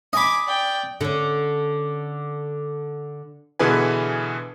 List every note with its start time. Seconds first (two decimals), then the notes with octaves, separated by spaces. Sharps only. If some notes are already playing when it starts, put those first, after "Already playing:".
0.13 D#5 G#5 B5 D6
0.46 D5 G5
1.01 D3 C#4
3.59 B2 D3 E3 G#4 B4 G#5